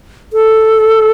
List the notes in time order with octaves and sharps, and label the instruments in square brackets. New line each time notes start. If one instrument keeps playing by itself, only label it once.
[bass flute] A4